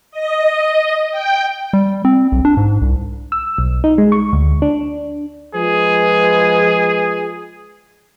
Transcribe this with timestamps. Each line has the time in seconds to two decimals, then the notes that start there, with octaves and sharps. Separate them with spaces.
0.11 D#5
1.11 G5
1.73 G3
2.05 C4
2.32 B1
2.45 D4
2.57 G#2
2.82 C2
3.32 E6
3.58 B1
3.84 D#4
3.98 G#3
4.12 C#6
4.33 D2
4.62 D4
5.55 F3 G#3 G#4 B4